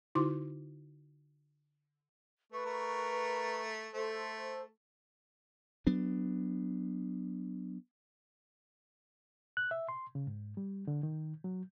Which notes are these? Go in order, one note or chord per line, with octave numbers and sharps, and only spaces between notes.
D3 D#4 E4 F#4 C6 D6
A3 B4 C#6
A3 A#4
A3 A4 C5
F#3 B3 D4
F#6
E5
C6
C#3
G#2
G3
D3
D#3
F#3